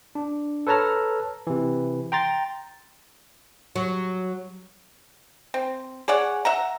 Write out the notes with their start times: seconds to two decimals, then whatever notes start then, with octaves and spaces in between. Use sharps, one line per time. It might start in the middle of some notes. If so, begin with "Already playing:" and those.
0.15 D4
0.67 A4 B4 C#5 A5 A#5 F6
1.47 C3 E3
2.12 G5 A#5 C6 A6
3.76 F#3
5.54 C4
6.08 G#4 C#5 D5 F#5
6.45 E5 F#5 A#5